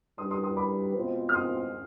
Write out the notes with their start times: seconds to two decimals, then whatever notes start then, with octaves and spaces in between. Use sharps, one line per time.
0.18 G3 D4 G4 B4 C6 D#6
0.31 C6 D#6
0.44 C6 D#6
0.57 B5 D6
0.95 B2 G#3 C4 F4 C5
1.29 F6
1.34 C6 D#6